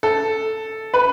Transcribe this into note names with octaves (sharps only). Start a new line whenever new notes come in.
A4
B4